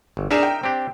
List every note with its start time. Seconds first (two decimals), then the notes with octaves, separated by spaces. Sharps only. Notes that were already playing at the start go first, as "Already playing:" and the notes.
0.17 G1
0.31 D4 D#4 G#4 A#4 E5 E7
0.43 G5
0.63 C4 D4 G4